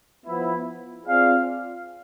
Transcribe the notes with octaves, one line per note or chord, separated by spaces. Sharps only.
F3 B3 E4
C4 F4 G#4 D5 F5